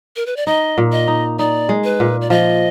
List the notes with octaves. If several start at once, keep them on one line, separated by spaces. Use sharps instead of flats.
A#4
B4
D5
D#4 D#5
A#2
D#5
D#4
D#4 D5
G#3
B4
A#2
D5
F3 D#5